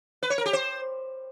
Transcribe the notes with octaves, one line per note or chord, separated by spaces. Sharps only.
B4
C#5
A#4
G4
C5